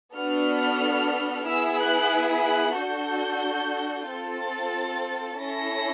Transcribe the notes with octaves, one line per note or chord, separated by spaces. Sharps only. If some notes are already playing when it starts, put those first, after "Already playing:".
B3 D4 F#4 A4 F6
B3 E4 G#4 E6
F#6
F#6
D4 F#4 A4 G6
C4 F4 A4 A6
C#4 E4 A4 A#6